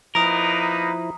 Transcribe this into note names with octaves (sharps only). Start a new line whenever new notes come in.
F3 A#3 D#4 E4 A#4 B4 A#5 D#6